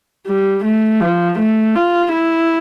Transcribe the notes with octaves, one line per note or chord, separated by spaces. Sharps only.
G3
A3
F3
A3
F4
E4